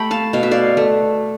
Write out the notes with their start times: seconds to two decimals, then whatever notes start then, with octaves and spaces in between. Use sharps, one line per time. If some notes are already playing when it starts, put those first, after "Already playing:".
Already playing: A3 G4 A4 G5 B5
0.11 F5 A5
0.33 B2 F5
0.43 E5
0.51 D5 F5
0.77 A3